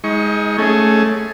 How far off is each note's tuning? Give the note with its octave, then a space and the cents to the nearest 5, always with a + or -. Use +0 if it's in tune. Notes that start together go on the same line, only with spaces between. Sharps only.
G#3 +0 D#4 +35 C#6 +0
A3 +0 C#4 +0 G#4 +10